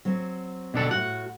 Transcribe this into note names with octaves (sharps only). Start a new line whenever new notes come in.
F#3 C4
B2 D4 A4
A2 F#4 F#5